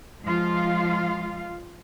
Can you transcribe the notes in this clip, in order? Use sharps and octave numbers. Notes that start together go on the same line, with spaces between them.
F3 G#3 F4 F5